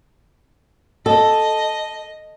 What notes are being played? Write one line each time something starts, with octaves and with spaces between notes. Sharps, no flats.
A4 D#5